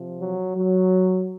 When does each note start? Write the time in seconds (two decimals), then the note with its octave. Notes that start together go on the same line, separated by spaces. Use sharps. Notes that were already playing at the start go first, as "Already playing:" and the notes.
Already playing: C3 F3
0.20 F#3
0.56 F#3